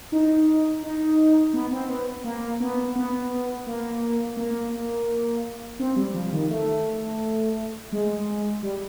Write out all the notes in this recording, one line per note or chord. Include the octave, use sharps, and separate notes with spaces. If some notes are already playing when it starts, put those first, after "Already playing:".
D#4
D#4
B3
C4
B3
A#3
B3
B3
A#3
A#3
C4
G3
F3
D#3
A3
G#3
G3